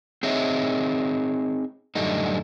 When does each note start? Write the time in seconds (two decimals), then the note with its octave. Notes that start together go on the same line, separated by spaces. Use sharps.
0.23 C4 D#4 G#4 C#5 D#5 E5
1.95 F#2 A2 D3 G3 A3 D#4